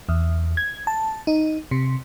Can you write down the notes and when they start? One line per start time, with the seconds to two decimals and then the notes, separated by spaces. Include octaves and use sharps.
0.09 E2
0.57 G#6
0.87 A5
1.27 D#4
1.71 C3